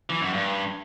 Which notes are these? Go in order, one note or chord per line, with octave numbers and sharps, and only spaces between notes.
E3
F#2
G2